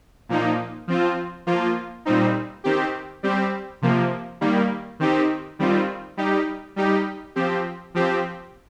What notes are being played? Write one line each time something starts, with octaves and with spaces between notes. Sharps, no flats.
A#2 F3 A#3 D#4
F3 C4 F4
F3 A#3 F4
A#2 G3 C4 D#4
D#3 C4 G4
G3 C4 G4
C3 F3 A#3
D#3 G3 A#3
D#3 C4 D#4 G4
D#3 G3 C4 F4
G3 D#4 G4
G3 D#4 G4
F3 C4 G4
F3 C4 G4